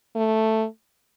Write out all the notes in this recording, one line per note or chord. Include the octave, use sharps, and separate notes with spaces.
A3